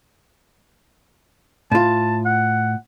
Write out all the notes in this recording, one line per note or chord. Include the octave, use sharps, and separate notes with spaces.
A2 F4 A5
F#5